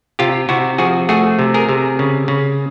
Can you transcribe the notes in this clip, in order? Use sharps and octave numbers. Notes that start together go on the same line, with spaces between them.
C3 F4 G4
C3 E4 F#4
F3 F#4 G#4
A3 F#4 G#4
C3
G#4 A#4
C3
C#3
C#3